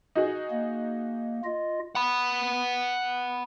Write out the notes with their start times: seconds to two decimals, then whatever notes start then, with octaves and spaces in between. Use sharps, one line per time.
0.15 D#4 F#4 G#4
0.51 A#3
1.44 F4 D#5
1.95 F#5 B5